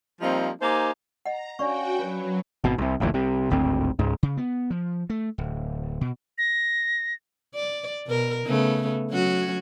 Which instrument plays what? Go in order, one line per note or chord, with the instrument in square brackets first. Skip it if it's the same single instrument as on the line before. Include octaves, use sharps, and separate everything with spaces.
[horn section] F3 G3 A#3 C4 D#4
A#3 D#4 G4 C5 G#5
[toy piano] D#5 F#5 [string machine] A#5
[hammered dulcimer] C#4 F5 G#5 [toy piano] D4 D5 C#6 [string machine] F#4 G5
[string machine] F#3 [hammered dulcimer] B4
[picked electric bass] G#1 B2
C2 C3
F1 A#1 D#2 A2
C2 C3
D1 G#1 D2 C4
C#2 G#2
[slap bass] C#3
B3
F3
A3
D1
B2
[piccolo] A#6
[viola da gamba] D5
B2 A#4
C#3 A3 B3
F#3 C#4 F#4